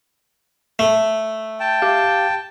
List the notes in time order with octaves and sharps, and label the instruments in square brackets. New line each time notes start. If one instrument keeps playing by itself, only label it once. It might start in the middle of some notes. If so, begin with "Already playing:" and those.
[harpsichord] A3
[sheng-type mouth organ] G5 A5
[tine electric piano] G4 F5